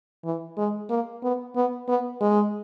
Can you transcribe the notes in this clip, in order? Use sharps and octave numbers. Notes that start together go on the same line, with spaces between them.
E3
G#3
A#3
B3
B3
B3
G#3